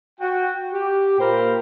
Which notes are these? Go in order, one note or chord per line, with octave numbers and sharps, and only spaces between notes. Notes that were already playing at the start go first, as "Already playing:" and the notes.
F#4 G5
G4
A#2 A#3 A#4 C5 G5 B5